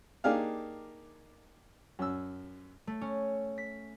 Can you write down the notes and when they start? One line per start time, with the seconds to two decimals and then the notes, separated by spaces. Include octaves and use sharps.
0.24 A#3 D4 D#4 G4 G#4 F5
1.99 F#2 E6
2.87 A3
3.01 C#4
3.58 B6